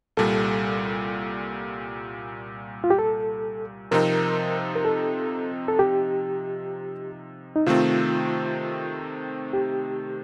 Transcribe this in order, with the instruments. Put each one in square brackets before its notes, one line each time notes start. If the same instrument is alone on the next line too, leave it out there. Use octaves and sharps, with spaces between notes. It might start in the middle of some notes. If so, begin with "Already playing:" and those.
[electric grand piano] C2 A#2 G3 [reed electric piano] A4
[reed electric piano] F4
G4
A4
[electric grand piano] C3 F3 C4 D#4 [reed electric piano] A#4
[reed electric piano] A#4
A4
A4
G4
D#4
[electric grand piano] C3 D#3 A3 C4 [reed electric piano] F4
[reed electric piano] G4